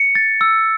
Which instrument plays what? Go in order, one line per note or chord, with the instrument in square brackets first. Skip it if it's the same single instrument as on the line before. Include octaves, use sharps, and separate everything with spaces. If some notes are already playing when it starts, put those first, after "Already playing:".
Already playing: [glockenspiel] C#7
A6
E6